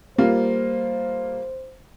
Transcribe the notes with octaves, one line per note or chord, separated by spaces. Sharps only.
G3 A#3 F4 C5